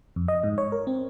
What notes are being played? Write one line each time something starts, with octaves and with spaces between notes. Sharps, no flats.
F2
D#5
G#2
C#5
A#4
C4